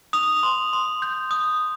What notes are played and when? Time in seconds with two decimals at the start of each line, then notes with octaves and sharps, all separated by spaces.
0.13 D#6 F7
0.43 C6
0.73 C6
1.02 G6
1.31 D#6